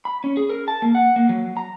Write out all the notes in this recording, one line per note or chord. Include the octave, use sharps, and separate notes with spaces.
B5
C#4
G#4
A#4
A5
A#3
F#5
A#3
F#3
A#5